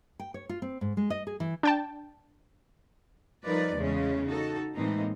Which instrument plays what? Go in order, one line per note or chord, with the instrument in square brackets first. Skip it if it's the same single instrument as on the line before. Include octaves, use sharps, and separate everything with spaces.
[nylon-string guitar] G5
C#5
F4
C4
G#2
G#3
D#5
G#4
E3
[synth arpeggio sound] D4 G5 A5
[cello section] F3 G3 D#4 A#4 B4 D5
E2 C#3 G#3 A3 C#4
D#4 F#4 A4
A2 E3 G#3 A#3 C4 D#4